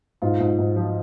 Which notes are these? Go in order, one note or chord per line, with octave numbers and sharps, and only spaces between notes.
G#2 F4
G#2
G#2
F3